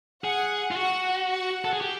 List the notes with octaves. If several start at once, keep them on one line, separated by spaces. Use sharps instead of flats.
G#4 F#5
F4
F#4 F#5
F#5
A4
G#4
G4